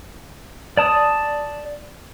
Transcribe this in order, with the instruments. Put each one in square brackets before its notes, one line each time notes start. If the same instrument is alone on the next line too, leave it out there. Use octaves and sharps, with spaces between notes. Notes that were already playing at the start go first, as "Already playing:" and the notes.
[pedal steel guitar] D5 A5 D#6